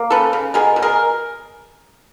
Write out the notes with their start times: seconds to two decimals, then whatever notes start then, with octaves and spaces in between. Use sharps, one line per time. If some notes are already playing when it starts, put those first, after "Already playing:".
Already playing: A#3
0.10 C#3 A4 B4
0.33 C#3
0.54 B2 G#4 A#4
0.76 B2
0.82 G#4 A#4